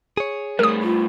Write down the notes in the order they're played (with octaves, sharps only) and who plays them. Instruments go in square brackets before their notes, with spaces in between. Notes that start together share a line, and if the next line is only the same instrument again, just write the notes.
[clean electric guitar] G#4 C#5
[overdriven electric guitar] A2 G3 [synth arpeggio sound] A#4 D#6
[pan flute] F4